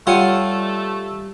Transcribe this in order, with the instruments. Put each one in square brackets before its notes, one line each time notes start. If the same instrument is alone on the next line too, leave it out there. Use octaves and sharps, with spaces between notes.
[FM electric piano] G3 [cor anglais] A3 [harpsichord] F4 [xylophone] C#5 F#5 D#7